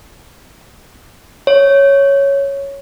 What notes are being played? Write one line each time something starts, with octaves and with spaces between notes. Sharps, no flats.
C#5